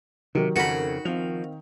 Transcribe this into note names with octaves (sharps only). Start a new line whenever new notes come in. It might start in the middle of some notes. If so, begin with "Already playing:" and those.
C3 D#3 F#3 G4 A#4
F2 C#3 F#4 A4 A#4 B5
F3 C4 F5 F7